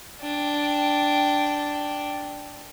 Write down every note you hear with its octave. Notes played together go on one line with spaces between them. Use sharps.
D4 G5